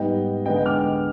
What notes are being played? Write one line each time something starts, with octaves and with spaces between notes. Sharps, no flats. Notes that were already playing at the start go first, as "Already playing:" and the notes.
Already playing: G#2 G3 B3 D#5 G5
D3 G#3 B3 D4 D#5 G5
D#5 G5
D6 F6